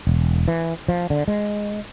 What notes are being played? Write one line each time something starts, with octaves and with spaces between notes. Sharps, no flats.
E1
E3
F3
D3
G#3